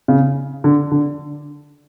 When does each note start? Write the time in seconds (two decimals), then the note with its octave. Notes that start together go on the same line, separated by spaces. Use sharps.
0.08 C#3
0.64 D3
0.91 D3